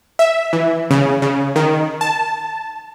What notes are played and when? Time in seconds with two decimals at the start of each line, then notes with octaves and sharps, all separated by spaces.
0.19 E5
0.53 E3
0.90 C#3
1.22 C#3
1.56 D#3
2.01 A5